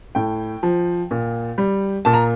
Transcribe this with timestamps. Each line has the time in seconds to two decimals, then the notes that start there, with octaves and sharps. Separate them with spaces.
0.15 A2 G5
0.63 F3
1.11 A#2
1.58 G3
2.05 A#2 A5
2.14 A#5